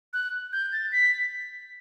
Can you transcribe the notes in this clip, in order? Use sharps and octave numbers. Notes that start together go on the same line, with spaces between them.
F#6
G6
A6
B6